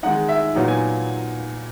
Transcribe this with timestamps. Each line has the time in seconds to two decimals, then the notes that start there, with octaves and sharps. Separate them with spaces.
0.03 D#3 G#3 D#4 F#5
0.29 E5
0.55 A#2 F#3 B3 D#4
0.68 G#5